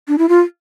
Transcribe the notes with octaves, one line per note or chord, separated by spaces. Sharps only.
D4
E4
F4